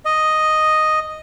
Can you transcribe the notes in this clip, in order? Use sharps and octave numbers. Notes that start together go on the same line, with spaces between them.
D#5